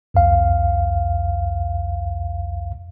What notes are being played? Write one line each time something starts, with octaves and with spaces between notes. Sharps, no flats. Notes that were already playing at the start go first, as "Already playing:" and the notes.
C2 F2 F5